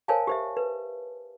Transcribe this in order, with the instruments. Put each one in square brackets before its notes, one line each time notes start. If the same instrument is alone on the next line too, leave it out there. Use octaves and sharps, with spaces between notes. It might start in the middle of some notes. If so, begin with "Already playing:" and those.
[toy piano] A#4 C5 C#5 F5 G#5 A5
G4 C5 E5
B4